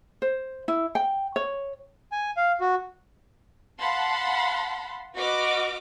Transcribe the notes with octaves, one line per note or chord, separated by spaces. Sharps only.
C5
E4
G5
C#5
G#5
F5
F#4
F5 F#5 A5 B5 C6
F#4 B4 D#5 D6 F6